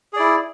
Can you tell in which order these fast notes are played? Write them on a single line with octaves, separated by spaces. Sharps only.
G#4 D5 E4